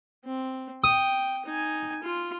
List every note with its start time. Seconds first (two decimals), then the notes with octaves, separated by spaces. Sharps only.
0.25 C4
0.84 G5 D#6
1.46 D#4 G#5
2.03 F4